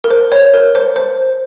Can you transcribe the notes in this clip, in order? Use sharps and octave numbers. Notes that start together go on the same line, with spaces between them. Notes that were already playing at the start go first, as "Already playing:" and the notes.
A#4
C5
C#5
A#4
C5
C5